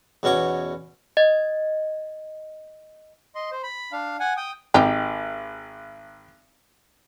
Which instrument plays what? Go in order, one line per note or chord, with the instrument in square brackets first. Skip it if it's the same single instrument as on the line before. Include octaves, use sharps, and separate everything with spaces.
[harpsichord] E2 B2 C#4 F#4 D6
[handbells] D#5 A6
[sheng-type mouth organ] D#5 C6
C5
B5
D4 F5
F#5 G#5
G5 D#6
[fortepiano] G#1 [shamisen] D#4 G4